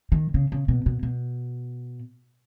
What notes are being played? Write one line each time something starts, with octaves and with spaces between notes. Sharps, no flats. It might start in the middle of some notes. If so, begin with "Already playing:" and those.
D#3
C#3
C#3
B2
B2
B2